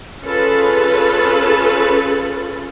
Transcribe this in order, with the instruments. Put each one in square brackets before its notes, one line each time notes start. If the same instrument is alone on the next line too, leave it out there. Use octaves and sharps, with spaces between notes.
[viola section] C#4 F4 G#4 A4 B4